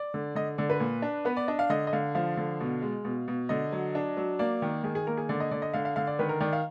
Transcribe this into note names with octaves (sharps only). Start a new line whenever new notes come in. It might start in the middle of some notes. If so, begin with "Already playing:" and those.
Already playing: D5
D3
D3 D#5
D3 D5
B4
A#2
D4
B3 B4
D5
D4 D#5
F5
D3 D#5
D#5
D3 F5
F3 F5
D3
B2
G#3
B2
B2
D3 D#5
F#3
D4
F#3
A#3 D5
D#3
D#3 G#4
G#4
A#3 A#4
G#4
D3 D5
D#5
D3 D5
D#5
D3 F5
F5
D3 F5
D5
D#3 B4
A#4
D#3 D5
F5